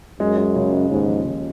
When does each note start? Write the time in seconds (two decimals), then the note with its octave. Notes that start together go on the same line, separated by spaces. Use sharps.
0.20 F#2 G#3
0.37 G#3
0.56 C#3
0.72 G#3
0.90 D#2 G#2
1.08 F3
1.26 C#3